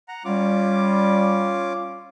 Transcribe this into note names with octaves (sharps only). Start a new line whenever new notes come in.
F#5 A#5
G3 C#4 F4 D6